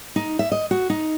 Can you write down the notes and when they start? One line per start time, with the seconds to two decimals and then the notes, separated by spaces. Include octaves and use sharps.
0.16 D#4
0.39 E5
0.52 D#5
0.71 F#4
0.90 D#4